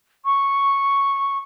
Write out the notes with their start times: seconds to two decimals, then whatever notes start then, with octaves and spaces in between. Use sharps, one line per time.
0.25 C#6